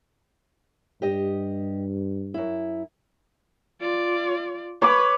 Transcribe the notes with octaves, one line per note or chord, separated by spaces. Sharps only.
G2 G4 D#5
F#2 E4
F4 D5
B4 C#5 B5 D6